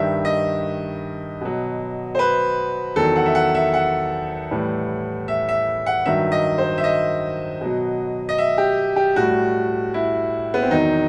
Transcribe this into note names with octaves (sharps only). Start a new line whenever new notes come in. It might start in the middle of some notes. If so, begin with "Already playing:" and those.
Already playing: G2 D#3 G3 E5
D#5
B2 F#3
C5
B4
E2 D#3 F#3 A4
F#5
E5
F#5
E5
F#5
A2 E3 G3
E5
E5
F#5
G2 D#3 F#3 E5
D#5
C5
E5
D#5
B2 F#3
D#5
E5
G4
G4
A2 G3 F#4
E4
B3
C4
E2 D#3 F#3 D#4